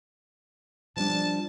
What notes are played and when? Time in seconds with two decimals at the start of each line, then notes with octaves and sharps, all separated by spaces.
0.97 F3 G3 D4 A5